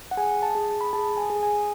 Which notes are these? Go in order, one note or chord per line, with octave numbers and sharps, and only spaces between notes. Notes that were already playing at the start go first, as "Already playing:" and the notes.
F#5
G#4 G#5
A5
G#4
B5
G#4 A5
G#5
G#4
G#5